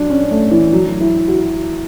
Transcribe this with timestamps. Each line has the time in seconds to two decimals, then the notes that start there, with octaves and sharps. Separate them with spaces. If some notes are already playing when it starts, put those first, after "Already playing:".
Already playing: F#3 D4
0.10 C#4
0.31 A3
0.51 E3
0.73 F#3
1.01 E4
1.28 F#4